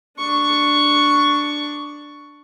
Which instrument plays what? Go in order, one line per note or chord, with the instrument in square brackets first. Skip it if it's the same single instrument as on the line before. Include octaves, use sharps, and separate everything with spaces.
[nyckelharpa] D4 C#6